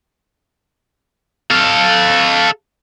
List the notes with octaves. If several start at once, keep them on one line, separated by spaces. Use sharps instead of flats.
A4 F5